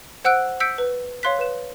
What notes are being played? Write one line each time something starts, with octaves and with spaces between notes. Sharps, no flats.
C5 F#5 E6 F#6 D7
E6 G6 B6 C#7 D7
B4
C#5 F5 C6 F#6 B6
B4 E7